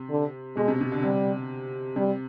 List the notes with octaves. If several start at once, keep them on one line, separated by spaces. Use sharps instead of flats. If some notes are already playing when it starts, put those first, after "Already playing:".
Already playing: C3
D3
B2 G#3
C3
C3
D3
C3 G3
C3 G3